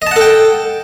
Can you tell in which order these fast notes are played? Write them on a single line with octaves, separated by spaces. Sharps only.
D#5 A5 F#5 A4 G5